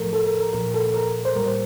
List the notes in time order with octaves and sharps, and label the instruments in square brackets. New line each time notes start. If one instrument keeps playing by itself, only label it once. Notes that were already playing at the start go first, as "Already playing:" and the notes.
Already playing: [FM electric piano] A2 F3 A3 A4 A#4
A4
A#4
A#4
A#2 F3 A#3 A#4
A4
A#4
C5
A2 G3 A#3 A#4
C5